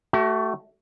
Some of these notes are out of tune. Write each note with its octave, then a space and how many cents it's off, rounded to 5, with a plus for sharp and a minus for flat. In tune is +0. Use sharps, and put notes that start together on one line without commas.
A3 +0 F#4 +40